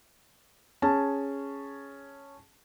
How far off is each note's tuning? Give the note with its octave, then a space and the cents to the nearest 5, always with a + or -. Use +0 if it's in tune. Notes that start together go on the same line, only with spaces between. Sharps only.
C#4 +0 G#4 +0 A5 +0